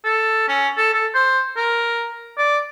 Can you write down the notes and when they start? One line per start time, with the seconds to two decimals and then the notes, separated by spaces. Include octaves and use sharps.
0.04 A4
0.48 C#4
0.77 A4
0.93 A4
1.14 C5
1.57 A#4
2.38 D5